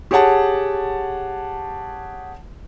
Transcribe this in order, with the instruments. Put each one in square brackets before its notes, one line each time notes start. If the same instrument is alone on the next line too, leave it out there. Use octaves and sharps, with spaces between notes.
[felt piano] G4 G#4 C#5 F#5 A5